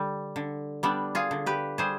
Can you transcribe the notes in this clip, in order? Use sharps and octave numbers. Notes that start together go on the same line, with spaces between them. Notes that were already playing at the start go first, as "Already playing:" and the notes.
Already playing: D3 G3
D3
G3 B3 D4
F4 G#4
D3
G4 B4
G3 G#4 C5